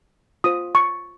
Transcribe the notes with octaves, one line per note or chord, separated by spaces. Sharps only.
F4 C5 D#6
C#6